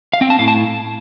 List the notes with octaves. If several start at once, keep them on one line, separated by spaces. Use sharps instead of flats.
F5
C4 G5
A5
A2 F5
A5